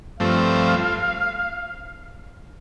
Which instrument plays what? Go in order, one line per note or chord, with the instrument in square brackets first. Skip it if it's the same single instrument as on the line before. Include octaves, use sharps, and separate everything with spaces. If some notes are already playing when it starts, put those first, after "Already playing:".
[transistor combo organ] G2 F3 A3 C4 [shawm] F5